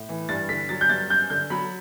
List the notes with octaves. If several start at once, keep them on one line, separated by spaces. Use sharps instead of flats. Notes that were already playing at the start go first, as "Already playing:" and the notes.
Already playing: A2
E3
G2 A6
D3 B6
F#3 A6
G6
G2 A6
F#2 G6
D3 G6
F#3 B5